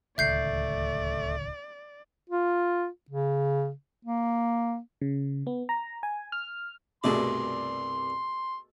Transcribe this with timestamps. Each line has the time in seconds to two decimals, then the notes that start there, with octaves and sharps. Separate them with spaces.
0.18 D1 C#2 D#3 A3 D5 E5 G6 C7
2.30 F4
3.10 C#3
4.05 A#3
5.02 C#3
5.47 B3
5.69 A#5
6.03 G#5
6.32 F6
7.04 C2 G2 B2 A3 G#4 D5 C6